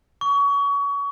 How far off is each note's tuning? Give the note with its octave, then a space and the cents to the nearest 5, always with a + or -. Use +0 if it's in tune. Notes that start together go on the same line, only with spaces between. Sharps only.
C#6 +30